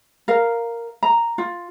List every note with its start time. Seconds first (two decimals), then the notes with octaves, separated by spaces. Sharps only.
0.28 A#4 F5
1.03 A#5
1.38 F4